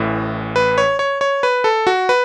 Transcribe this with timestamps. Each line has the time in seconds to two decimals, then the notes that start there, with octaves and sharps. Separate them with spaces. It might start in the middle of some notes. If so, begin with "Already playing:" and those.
Already playing: A1 A2 E3
0.56 B4
0.78 C#5
0.99 C#5
1.21 C#5
1.43 B4
1.64 A4
1.87 F#4
2.09 B4